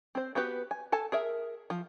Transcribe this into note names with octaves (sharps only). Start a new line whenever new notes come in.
C4 C5
B3 F#4 G4 B4
G#5
A4 G#5 A5
G#4 A#4 E5
F3